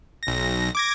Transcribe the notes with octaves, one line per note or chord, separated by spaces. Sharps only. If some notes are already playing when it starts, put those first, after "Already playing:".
B1 A#6
D6 G#6 A#6